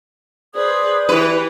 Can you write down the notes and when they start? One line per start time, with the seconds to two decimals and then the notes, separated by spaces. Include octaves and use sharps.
0.55 G#4 B4 C5 D5 D#6
1.09 E3 G4 B4